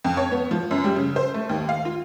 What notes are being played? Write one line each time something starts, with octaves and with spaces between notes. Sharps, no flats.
F2
C#5
B3
F3
F#2
G3
C#3
C5
A3
D#2
F5
F4